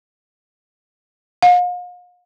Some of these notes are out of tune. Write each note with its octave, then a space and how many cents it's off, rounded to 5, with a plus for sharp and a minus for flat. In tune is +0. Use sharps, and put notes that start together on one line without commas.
F5 +40